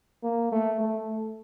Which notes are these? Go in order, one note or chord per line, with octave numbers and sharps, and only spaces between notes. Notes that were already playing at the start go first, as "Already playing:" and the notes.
A#3
A3
A3